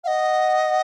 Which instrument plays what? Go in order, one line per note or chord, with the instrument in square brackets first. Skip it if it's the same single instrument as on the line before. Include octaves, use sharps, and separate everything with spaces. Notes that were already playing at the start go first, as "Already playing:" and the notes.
[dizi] D#5 F5 [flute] F#5